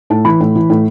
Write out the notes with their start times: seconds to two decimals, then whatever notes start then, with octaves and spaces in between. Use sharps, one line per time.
0.10 A2 A5
0.25 E3 B5
0.40 A2
0.55 E3
0.70 A2